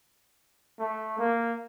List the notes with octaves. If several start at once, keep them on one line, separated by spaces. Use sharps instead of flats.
A3
A#3